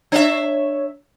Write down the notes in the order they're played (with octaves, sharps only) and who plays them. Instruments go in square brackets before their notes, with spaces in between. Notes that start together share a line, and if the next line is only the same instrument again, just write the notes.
[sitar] D4 E5 [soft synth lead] C#5